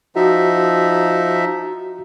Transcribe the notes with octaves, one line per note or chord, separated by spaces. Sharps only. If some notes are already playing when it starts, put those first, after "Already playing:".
F3 D#4 F#4 E5